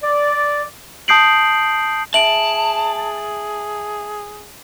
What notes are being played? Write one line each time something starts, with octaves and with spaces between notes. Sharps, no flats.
D5
A5 D#6 G6 C7 D7 F#7
G#4 E5 A5 D7 F#7